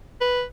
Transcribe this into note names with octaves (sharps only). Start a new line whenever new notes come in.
B4